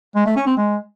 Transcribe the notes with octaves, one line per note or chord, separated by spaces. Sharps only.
G#3
A3
C#4
C4
G#3